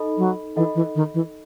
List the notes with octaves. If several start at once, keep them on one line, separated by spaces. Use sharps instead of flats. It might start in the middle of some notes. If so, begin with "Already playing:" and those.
Already playing: D#4 A4 D#5 B5
F#3
E3 D#4 A4 D#5 F#5 B5
E3
D#3
E3